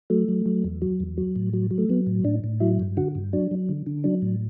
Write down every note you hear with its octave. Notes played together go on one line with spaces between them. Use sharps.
F#3 A3
F#3
F#3
E2
F#3
E2
F#3
A2
F#3
F#3
A3
F#3 B3
A2
A2 D4
A2
F#3 E4
G2
D3 F#4
G2
F#3 D4
F#3
D3
D3
F#3 D4
A2